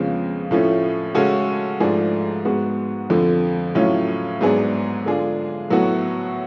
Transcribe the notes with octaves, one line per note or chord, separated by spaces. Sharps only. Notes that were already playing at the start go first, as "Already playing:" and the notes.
Already playing: F2 C#3 G#3 B3 F4
A2 F3 A3 C#4
C#3 G#3 C#4 F#4 A4
G#2 F3 A3 D4 G#4
G#2 G#3 B3 F#4
F2 D3 F3
A2 F#3 C#4 F4
G#2 F#3 B3 D4 G#4
D3 G#3 D4 F4 G#4
A2 F#3 B3 F#4 A4